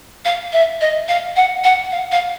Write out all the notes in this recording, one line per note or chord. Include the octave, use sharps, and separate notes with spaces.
F5
E5
D#5
F5
F#5
F#5
F5
F5